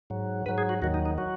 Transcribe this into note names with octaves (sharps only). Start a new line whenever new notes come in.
G#2 F#3
G#2 F#3 B4
G#4
F#4
D#2 D#3 F#3 F#4
D#4
D#4
F#3 F#4